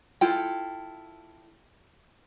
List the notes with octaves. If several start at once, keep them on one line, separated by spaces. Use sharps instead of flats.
E4 F4 A4 G5